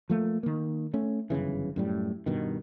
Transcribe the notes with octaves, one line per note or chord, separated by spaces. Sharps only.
F3 A3 A#3
D#3 A#3
A3 C#4
G1 F#2 C#3 E3
F#2 A2 G3
G2 B2 D#3